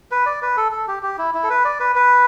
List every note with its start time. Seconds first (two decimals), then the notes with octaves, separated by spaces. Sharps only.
0.11 B4
0.26 D5
0.42 B4
0.57 A4
0.72 A4
0.88 G4
1.03 G4
1.18 E4
1.34 E4
1.43 A4
1.50 B4
1.64 D5
1.80 B4
1.96 B4